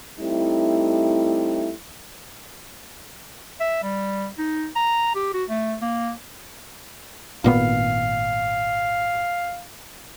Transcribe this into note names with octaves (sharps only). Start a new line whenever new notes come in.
G3 A3 C4 D#4 E4
E5
G3
D#4
A#5
G4
F#4
A3
A#3
G#1 A#2 B3 F5